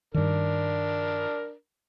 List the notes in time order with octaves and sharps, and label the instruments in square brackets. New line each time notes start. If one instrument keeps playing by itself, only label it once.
[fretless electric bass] G2 D#3 [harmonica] D4 A#4